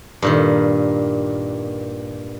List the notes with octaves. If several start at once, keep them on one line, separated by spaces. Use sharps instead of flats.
G2 A#2 D#3